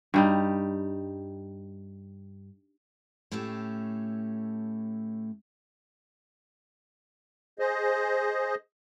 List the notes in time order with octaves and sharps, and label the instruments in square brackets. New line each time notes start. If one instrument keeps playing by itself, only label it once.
[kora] G2 G3 D#4
[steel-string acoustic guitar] A2 A3 C#4 G4 E5
[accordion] G#4 C5 D#5